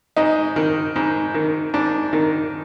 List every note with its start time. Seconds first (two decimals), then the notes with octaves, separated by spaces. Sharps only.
0.16 G#2 D#4
0.56 D#3
0.96 G#2
1.34 D#3
1.74 G#2 D4
2.13 D#3